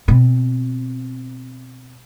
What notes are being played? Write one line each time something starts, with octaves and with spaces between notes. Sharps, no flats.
B2 C4